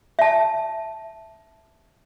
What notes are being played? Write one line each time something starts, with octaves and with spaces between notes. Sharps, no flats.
E5 A5